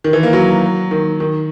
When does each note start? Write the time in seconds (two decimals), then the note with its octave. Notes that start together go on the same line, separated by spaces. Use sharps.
0.04 D#3
0.13 E3
0.23 A#3
0.33 F#3
0.91 D#3
1.20 D#3